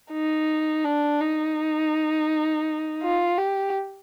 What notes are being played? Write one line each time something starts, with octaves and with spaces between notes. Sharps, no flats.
D#4
D4
D#4
F4
G4